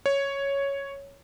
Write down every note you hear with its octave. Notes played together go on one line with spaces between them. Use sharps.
C#5